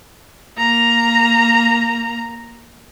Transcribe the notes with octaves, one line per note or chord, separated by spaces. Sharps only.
A#3 A#5